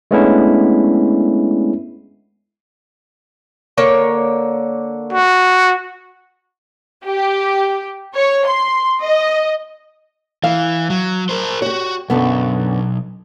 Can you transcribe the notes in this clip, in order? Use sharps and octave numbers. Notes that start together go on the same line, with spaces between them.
G#3 A3 B3 C#4 D4 E4
D3 A#3 C#5
F#4
G4
C#5
C6
D#5
E3 F5
F#3
A#4 C5
F#4 G4 C#5
B1 F#2 D3 B3